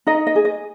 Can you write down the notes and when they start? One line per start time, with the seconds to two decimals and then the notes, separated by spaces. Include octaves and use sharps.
0.07 D#4 D#5
0.27 D#5
0.35 G#4
0.45 D#5